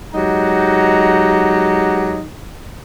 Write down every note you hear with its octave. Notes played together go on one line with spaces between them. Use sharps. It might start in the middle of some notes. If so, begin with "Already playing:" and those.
F#3 G#3 D#4 G4 F#5 A#5